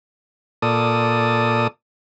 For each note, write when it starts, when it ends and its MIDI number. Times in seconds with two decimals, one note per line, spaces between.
0.62 1.67 46
0.62 1.67 69
0.62 1.67 74
0.62 1.67 87